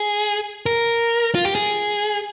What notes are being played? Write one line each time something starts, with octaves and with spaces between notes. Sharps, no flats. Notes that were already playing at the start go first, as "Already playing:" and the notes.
Already playing: G#4
A#4
F4
G4
G#4